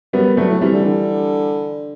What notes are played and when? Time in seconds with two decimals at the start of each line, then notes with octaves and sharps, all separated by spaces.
0.13 F#2 G3 B3
0.26 F#2
0.37 G2 F#3 A3
0.50 A2
0.61 C3 E3 G3
0.73 D3
0.85 D3